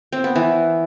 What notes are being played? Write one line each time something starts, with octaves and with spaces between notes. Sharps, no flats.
C4
B3
E3